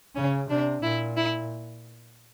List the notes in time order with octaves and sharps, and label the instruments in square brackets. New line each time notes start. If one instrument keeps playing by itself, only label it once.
[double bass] C#3 [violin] C#4
[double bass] C3 [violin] D4
[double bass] A#2 [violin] E4
[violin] E4